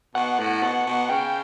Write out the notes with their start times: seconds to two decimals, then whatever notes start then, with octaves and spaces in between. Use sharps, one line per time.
0.15 B2 F#5
0.39 A2
0.62 B2
0.86 B2
1.09 C#3 G5